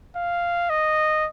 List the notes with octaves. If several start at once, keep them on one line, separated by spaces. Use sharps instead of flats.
F5
D#5